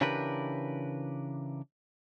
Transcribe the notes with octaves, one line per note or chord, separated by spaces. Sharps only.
C#3 E3 D4 G4 A#4 B4